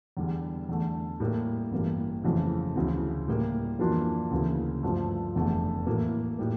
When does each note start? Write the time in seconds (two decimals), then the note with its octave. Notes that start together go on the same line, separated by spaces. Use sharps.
0.17 E2 D3 G3
0.69 E2 D3 A3
1.20 A2 G3 A#3
1.72 A1 G2 E3 G3 A#3
2.24 F2 C#3 E3 A3
2.76 D2 C#3 E3
3.28 A2 G3 A#3
3.79 F2 E3 A#3 D4 F4
4.31 D2 C#3 E3 A#3
4.83 G2 F3 A3
5.35 F1 E2 D3 A3
5.87 A2 E3 A#3
6.39 A2 G3 A#3